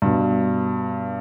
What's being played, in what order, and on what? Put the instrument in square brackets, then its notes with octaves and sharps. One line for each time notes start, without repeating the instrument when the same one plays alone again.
[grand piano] G2 B2